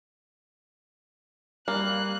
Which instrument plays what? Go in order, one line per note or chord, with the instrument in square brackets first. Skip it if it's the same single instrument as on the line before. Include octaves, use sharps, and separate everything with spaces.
[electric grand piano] G3 [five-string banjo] A#3 [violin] F#6